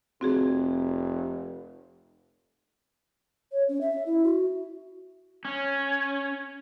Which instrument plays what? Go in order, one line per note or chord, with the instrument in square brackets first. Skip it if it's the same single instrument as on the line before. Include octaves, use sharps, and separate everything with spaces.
[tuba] F1 [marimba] C4 F#4 G#4
[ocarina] C#5
C#4
E5
E4
F#4
[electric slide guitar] C#4